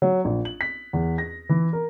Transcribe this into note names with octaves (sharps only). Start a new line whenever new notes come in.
F#3
A#1
F#7
B6
E2
A#6
E3
A#4